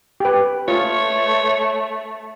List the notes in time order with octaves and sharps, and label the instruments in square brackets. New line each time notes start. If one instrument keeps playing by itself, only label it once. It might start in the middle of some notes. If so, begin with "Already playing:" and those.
[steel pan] G4 B4
[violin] A3 [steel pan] F4 [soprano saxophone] C#5